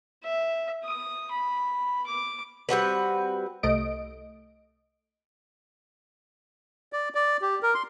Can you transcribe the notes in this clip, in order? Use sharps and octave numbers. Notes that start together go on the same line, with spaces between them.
E5
D#6
B5
D6
G3 C4 F#4 B4
C2 A3 D#5 D7
D5
D5
G4
A#4
C6